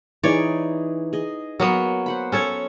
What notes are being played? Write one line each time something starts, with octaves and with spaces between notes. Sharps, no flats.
E3 D#4 G#4 C#5 D5
G#4 D#5
F#3 A#3 B3
C5 F#5 B5
C#4 A4 C#5